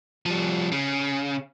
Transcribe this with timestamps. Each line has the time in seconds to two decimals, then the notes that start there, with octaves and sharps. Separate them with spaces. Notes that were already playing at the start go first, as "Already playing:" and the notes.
0.26 F3 G3
0.72 C#3